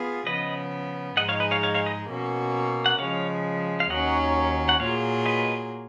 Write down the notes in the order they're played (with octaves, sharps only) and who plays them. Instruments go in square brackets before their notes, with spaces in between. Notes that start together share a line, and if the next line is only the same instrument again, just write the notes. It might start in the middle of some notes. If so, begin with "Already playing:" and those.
Already playing: [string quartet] B3 F4 G#4
[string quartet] C#3 F3 B3 [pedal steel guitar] B4 D#5
[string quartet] G#2 F3 G#3 D#4 G#4 [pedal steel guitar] D#5 F#5
[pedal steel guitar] C#5 F5
B4 D#5
C#5 F5
C#5 F5
C#5 F5
B4 D#5
[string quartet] B2 A#3 C#4 F#4
[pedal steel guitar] F#5
[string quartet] C#3 F3 G#3 [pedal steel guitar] C#5 F5
[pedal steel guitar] F5
[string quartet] D#2 D#3 F#3 C#4 [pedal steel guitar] D#5 F#5
[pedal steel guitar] F#5
[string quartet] A#2 F#3 A#3 F4 G#4 [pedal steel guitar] C#5 F5
[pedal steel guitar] B4 D#5